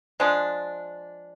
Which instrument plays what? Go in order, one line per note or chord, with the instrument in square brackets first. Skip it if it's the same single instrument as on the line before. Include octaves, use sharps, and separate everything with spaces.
[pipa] F3 G#3 D4